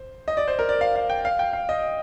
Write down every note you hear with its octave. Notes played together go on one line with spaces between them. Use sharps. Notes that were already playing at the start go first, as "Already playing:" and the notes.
Already playing: C5
D#5
D5
C5
A#4
D5
F5
F5
G5
F5
G5
F5
D#5